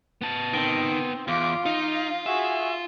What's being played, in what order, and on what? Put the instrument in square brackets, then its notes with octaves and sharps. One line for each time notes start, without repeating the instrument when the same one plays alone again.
[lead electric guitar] B3 A5
[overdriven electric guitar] D#3 [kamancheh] C4
[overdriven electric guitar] E2 [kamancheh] F4 D6
[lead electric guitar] D#4 [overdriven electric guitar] F4 [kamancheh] F5
[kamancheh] F#4 G#4 [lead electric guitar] E5